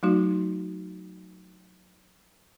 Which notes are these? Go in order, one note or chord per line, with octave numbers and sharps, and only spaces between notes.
F#3 A3 D#4 F#4